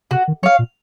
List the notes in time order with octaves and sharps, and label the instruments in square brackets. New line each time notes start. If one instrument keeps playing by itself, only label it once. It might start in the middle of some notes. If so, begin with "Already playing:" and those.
[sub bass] C3 [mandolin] F#4
[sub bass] D#3
[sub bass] F#3 [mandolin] C#5 F5
[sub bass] A#2